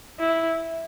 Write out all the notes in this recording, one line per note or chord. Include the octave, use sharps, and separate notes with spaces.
E4